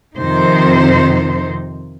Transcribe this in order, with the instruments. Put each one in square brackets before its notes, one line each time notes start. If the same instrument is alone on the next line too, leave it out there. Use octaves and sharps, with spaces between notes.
[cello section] F2 C3 D#3 C4 D#4 C5